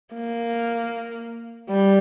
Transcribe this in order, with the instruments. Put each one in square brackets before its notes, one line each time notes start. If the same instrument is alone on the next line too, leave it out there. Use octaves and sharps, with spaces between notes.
[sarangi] A#3
G3